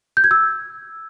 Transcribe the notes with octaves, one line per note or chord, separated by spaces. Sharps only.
G6
G#6
E6